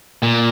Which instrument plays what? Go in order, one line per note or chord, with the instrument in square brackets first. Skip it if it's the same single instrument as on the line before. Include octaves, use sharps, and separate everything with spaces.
[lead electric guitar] A#2